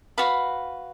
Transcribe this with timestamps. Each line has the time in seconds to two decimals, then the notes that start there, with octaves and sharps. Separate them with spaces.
0.18 F#4 B4 F5 B5